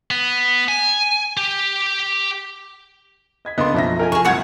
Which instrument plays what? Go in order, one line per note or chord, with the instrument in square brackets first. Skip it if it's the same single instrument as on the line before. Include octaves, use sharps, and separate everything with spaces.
[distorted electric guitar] B3
G#5
G4
[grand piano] D#5 G#6 B6
[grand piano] C#2 A#3 [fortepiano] B3 D4 [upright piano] D#5 C6
[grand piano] B1 F#2 [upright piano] F3 E5 A#6
[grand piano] F4 A4 D#5 [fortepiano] A#4 G5 G#5
[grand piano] C2 F6 E7 [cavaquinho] G#4 C#6
[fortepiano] D2 G2 C3 [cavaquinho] C#5 F#5 [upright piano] G#6 C#7